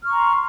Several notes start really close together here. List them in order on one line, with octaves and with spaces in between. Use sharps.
F6 C#6 A#5 C6